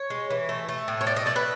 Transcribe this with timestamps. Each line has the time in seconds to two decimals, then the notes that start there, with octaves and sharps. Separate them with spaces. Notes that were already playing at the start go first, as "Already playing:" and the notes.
Already playing: C#5
0.10 G#3
0.30 E3
0.49 A3
0.69 A3
0.88 A2
1.01 C#5
1.07 A3 D5
1.16 D#5
1.26 A3 D5
1.36 B4